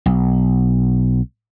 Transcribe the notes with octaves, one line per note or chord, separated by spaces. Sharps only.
B1